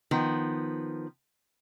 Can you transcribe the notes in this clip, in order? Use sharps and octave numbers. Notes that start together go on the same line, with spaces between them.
D#3 F3 B3